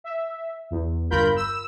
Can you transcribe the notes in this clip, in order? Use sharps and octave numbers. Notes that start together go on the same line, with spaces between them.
E5
E2
G1 F4 A#4 B5 G6
E6